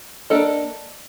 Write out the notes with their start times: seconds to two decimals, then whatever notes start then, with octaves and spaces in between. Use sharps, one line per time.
0.30 A#3 D4 A4 D#5